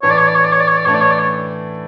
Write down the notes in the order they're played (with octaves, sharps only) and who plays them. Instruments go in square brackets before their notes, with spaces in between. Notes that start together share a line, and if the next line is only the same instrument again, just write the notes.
[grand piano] A2 E3 A3 D4 [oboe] C#5
[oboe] D5
C#5
D5
C#5
D5
C#5
D5
C#5
D5
[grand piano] A2 E3 A3 D4 [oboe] C#5
[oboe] D5
C#5
D5
C#5